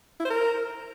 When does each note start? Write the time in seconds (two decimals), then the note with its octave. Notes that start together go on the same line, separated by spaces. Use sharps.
0.20 E4
0.25 C5
0.30 A#4